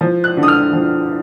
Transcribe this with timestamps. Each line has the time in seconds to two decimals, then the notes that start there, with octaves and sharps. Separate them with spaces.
0.01 F3
0.24 F#6
0.37 D3
0.43 D#6
0.48 F6
0.73 F3